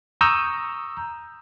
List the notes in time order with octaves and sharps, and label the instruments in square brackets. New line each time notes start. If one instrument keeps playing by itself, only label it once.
[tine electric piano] A#5 C#6 D#6 E6 G6